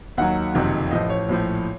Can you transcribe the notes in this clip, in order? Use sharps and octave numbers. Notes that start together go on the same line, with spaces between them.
D#2 D#3 F#3 F#5
F#1 F2 C3 D#3
A1 A2 F3 D#5
C#5
A#1 A2 F3